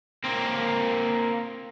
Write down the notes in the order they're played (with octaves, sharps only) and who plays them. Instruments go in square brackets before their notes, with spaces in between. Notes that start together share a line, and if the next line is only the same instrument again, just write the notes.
[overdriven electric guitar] A#3 C4